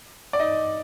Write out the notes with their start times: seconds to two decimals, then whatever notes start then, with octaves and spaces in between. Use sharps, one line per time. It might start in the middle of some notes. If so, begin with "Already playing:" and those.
0.33 D5
0.40 D#4 D#5